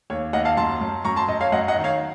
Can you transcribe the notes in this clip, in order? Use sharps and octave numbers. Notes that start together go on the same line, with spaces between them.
D#2 C#5
D#2 D#5 F#5
F5 A5
F#2 A5 C6
F#2
F#2 A#5 C#6
A5 C6
F#2 D#5
C#5 F5
F#2 D#5 F#5
D#5 F#5
D#3
C#5 F5